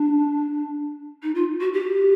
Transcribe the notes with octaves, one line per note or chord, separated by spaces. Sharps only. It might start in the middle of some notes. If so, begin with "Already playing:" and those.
Already playing: D4
D#4
F4
F#4
G4